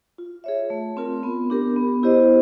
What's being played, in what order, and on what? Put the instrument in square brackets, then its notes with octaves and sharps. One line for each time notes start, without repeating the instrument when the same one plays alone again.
[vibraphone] F4
G#4 C#5 E5
A3
C4 F4 A#4
B3
D4 G4 A#4
B3
E4 G4 C5 D#5